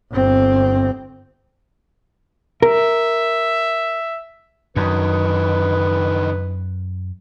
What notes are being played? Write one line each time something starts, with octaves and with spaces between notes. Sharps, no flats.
G1 C4
A#4 E5
F#2 D3 D#3 B4